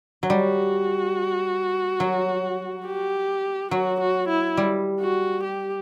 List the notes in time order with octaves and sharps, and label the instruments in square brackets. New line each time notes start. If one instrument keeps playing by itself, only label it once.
[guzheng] F#3
[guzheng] G3 [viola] F#4
[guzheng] F#3
[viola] G4
[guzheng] F#3 [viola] F#4
[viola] F#4
E4
[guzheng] G3
[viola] F#4
G4